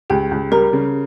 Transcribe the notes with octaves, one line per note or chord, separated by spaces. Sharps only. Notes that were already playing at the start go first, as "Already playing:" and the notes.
C#2 G4 G5
C#2
G3 A#4 A#5
C#3